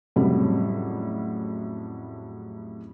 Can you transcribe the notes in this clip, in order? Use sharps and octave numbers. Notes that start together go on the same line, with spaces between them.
F2 A2 C#3 F#3 G3